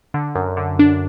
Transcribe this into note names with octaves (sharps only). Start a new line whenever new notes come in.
D3
F#2
D3
D4